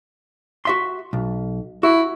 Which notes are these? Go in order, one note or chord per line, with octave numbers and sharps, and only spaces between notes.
F#4 E5 C6
B1
E4 F#4